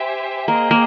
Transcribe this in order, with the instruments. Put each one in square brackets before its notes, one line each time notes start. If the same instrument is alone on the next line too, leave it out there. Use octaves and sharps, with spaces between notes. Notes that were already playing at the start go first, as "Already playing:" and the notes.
Already playing: [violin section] G4 C5 E5 G#5
[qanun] A#3 [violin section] G#4 C5 D#5 G5
[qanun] A#3